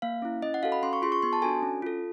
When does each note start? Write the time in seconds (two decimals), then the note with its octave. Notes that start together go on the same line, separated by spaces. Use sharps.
0.02 A#3 F5
0.22 C#4 E4
0.42 C#4 D#5
0.54 F#5
0.63 F#4 A4 F5
0.72 B5
0.83 C#4 C6
0.93 C#6
1.02 F4 G#4 C6
1.12 C#6
1.22 B3 C6
1.33 A5
1.42 D4 F#4 A4 G#5
1.63 C#4
1.82 F4 A4